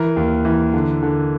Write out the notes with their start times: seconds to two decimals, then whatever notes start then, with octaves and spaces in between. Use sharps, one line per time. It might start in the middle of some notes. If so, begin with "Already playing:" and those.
Already playing: E3 A#4
0.16 D#2
0.45 E3
0.74 D3
1.03 D3